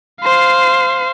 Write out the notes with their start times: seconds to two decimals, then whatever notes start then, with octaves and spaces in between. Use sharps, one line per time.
0.22 C5 F5